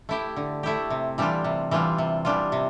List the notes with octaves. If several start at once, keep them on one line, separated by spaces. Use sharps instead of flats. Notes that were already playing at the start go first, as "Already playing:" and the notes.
A3 E4 G4
D3
A3 E4 G4
C3
E3 G3 D4 F4
C3
E3 G3 D4 F4
C3
E3 G3 D4 F4
C3